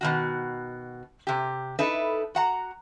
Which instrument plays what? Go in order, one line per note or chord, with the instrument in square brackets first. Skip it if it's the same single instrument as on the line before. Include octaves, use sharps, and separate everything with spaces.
[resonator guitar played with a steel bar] B2 D#3 F#4
C3 G4
D#4 E4 A4 B4
F#4 F#5 A#5